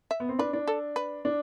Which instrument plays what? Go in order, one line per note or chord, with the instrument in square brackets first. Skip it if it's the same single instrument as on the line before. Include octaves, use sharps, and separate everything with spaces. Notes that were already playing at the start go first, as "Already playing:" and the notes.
[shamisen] E5
[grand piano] B3
C4
[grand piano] D4 [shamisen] B4
[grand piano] D4
[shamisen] A4
B4
[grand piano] D4